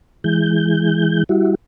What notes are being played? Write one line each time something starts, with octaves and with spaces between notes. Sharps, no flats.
E3 G#3 G6
G3 E4 F#4